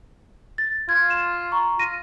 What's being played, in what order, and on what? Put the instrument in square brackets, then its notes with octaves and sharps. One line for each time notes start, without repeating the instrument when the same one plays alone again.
[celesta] A6
[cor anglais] F4 [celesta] G#6
[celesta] E7
A#5 C#6
[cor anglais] F4 [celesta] A#6 D#7